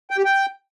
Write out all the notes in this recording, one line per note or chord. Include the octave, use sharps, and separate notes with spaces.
G5
G4
G5